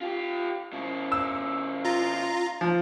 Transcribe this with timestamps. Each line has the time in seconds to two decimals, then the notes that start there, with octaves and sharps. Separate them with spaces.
0.01 F4 G4
0.73 C#3 E4
1.12 E6
1.85 F4 A#5
2.61 F3